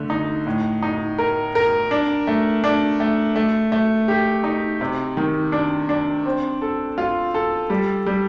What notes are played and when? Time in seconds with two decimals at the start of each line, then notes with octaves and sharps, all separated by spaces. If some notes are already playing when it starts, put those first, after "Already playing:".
Already playing: D3 A3
0.10 D#4
0.47 A2
0.83 D#4
1.18 A#4
1.55 A#4
1.91 D4
2.27 A3
2.64 D4
3.00 A3
3.36 A3
3.72 A3
4.08 G4
4.44 D#4
4.81 C3
5.17 D#3
5.52 D4
5.89 D4
6.26 C4
6.62 A4
6.98 F4
7.34 A4
7.70 G3
8.06 G3